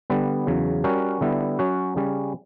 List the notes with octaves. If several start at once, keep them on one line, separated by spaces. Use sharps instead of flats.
D3 G3 B3
E2 C#3 F#3
G3 C#4 F#4 A#4
D3 G3 B3 E4
F#3 C#4 F#4
C#3 G3 C#4